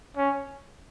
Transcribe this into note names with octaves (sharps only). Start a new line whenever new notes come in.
C#4